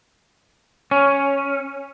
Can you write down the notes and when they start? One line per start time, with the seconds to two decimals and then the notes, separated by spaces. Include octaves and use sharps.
0.91 C#4